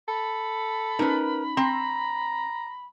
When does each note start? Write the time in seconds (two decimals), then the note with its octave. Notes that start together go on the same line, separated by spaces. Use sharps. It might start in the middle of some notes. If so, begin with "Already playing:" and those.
0.08 A4 B5
0.99 C#4 D#4 A#4 B4
1.57 C4 A#5 C6